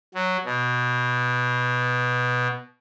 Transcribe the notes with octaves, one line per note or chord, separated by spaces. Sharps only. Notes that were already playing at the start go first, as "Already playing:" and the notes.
F#3
B2